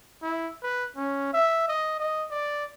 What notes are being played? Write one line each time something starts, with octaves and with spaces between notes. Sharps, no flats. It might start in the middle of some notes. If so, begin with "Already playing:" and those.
E4
B4
C#4
E5
D#5
D#5
D5